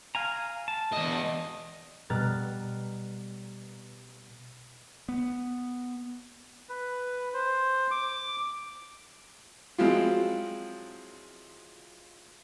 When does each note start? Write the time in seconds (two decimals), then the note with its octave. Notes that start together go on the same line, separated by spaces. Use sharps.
0.15 F5 G#5 A#5
0.68 A5
0.92 E2 D#5
2.10 B2 G3 A#5 F6 F#6 A6
5.08 B3
6.69 B4
7.34 C5
7.91 D6
9.78 F3 F#3 G#3 C4 E4 F4